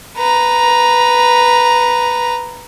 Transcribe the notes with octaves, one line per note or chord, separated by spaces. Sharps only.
B4 A#5